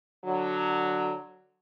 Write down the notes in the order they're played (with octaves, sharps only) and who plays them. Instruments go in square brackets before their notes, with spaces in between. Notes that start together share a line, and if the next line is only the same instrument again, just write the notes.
[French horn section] D3 F#3